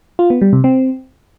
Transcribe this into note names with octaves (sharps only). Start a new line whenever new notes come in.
F4
B3
G3
C3
C4